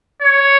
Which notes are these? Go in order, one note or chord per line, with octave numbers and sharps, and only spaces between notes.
C#5